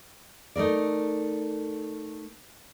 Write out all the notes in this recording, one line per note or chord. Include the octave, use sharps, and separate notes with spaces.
A3 D#4 A#4 D5